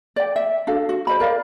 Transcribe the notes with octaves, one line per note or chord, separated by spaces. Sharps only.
D5 G5
E5
D4 F#4 A4 F5
F#4
C5 D#5 B5
A#4 D5 F5